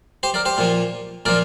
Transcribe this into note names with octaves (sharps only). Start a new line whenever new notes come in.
G4 C5
A#4 D5
G4 C5
A#2 F3
A#2 F3 A#4 D5